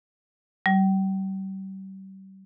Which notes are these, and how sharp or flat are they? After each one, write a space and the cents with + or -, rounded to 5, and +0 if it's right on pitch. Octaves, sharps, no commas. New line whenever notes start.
G3 -35